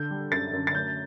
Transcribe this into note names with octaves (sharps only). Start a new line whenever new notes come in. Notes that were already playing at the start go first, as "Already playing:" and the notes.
Already playing: D3 G6
G3
F#2 A6
F#2
A6
A3 G6